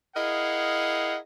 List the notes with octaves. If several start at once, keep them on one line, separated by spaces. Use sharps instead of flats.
E4 G#4 A#4 D#5 F5 F#5